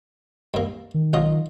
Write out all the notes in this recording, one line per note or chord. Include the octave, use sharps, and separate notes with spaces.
G2 A#3
D#3
B1 F4 D#5